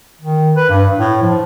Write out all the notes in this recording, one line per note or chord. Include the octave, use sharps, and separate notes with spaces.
D#3
B4
G2
A2
F3